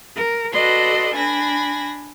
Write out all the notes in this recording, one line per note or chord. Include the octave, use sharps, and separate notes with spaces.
A#4
F#4 A4 B4 D5 D#5 C6
D4 G#5 B5 A#6